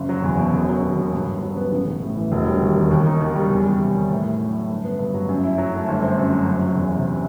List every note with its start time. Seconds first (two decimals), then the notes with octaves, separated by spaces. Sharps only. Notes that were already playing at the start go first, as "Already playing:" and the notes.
Already playing: F#1
0.09 F#3
0.24 E2
0.38 B2
0.54 E1
0.69 F#3
0.83 D#2
0.98 D#3
1.13 G2
1.28 G2
1.42 F#3
1.57 B3
1.72 A1
1.87 A1
2.02 A2
2.17 E3
2.32 E1
2.46 G3
2.62 D#2
2.76 D#3
2.91 D#2
3.06 D#4
3.21 D#3
3.36 G3
3.50 E2
3.66 G3
3.80 C3
3.95 D#3
4.10 A2
4.24 E4
4.39 F#3
4.55 A3
4.69 G1
4.85 B3
4.99 G2
5.14 F#3
5.29 F#2
5.43 E4
5.58 F#3
5.74 A3
5.88 G1
6.03 C4
6.18 F#2
6.32 F#3
6.47 F#1
6.62 F#3
6.76 E2
6.92 C3